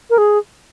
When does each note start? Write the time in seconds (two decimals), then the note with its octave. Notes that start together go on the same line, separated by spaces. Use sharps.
0.10 A#4
0.18 G#4